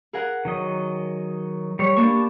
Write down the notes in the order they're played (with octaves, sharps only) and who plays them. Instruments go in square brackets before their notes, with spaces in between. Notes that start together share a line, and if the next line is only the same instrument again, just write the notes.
[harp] G#4 A#4 F#5
[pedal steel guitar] D#3 F#3 D#5
G3 C#5
[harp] A#3 B3 D4 [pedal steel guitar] G4 A5 C#6